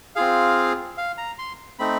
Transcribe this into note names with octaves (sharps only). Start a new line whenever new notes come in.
C4 F4 G#4 F5
F5
A#5
C6
A3 C4 D#4 B5